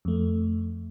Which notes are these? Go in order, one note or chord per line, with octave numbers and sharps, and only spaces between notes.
F2 A3